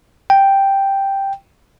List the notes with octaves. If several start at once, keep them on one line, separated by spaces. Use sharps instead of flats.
G5